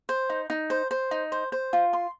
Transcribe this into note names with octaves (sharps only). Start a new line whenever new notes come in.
C5
D#4
D#4
C5
C5
D#4
C5
C5
F4
C6